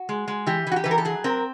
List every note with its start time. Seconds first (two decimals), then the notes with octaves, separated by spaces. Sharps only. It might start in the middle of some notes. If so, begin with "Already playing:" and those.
Already playing: F#4
0.09 G#3
0.28 G#3
0.47 E3 G4
0.67 E3 F#4
0.76 G4
0.84 E3 B4
0.91 A#4
0.98 A4
1.05 F#3 G#4
1.24 C4 A#4